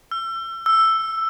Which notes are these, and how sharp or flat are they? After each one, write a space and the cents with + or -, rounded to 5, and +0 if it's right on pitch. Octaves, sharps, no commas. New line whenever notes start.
E6 +35
E6 +5